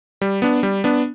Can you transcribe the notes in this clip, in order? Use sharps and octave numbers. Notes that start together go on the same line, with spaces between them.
G3
B3 D4
G3
B3 D4